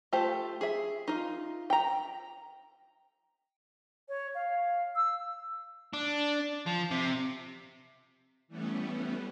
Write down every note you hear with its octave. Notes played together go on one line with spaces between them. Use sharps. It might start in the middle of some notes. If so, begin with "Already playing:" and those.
A3 F4 G4 C5 A5
G#4 E5
D#4 F4
G5 A#5
C#5
F5
E6
D4
F3
C3
E3 G3 A3 B3 C#4